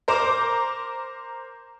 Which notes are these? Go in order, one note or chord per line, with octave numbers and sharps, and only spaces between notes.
A#4 C5 A#5 D6